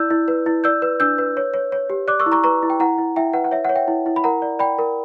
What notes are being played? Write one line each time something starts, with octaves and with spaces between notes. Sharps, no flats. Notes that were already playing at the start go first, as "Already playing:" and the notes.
Already playing: E4 D5 E6 G6
E4
B4
E4
D5 E6 G6
B4
D4 E6 G6
B4
C#5
C#5
C#5
G4
D5 D6 F#6
C#6 E6
E4
A#5 C#6
B4 A#5 C#6
E4
G5
E4 F#5 A#5
E4
E4 E5 G5
B4 F#5
F#5
C#5 E5
C#5 F#5
E5 G5
E4
E4
B5
A#4 F#5 A#5
D5
D5 G5 B5
A#4